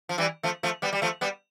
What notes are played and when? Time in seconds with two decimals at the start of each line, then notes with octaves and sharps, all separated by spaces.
0.09 F3
0.18 E3 G3
0.43 F3 A3
0.63 F3 A3
0.82 G3 B3
0.93 G3
1.02 F3 A3
1.21 G3 B3